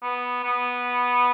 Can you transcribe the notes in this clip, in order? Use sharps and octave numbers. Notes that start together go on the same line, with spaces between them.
B3
B3